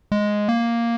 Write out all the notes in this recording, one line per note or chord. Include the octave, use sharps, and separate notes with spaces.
G#3
A#3